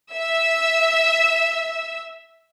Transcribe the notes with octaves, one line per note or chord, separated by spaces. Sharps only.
E5 E6